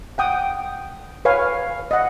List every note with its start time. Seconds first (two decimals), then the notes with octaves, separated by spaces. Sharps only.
0.18 F#5 G5 D#6
1.25 B4 C#5 F5 G#5
1.91 D#5 F#5